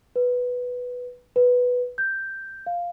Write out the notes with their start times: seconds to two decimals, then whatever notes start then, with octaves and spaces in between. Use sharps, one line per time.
0.16 B4
1.36 B4
1.98 G6
2.67 F5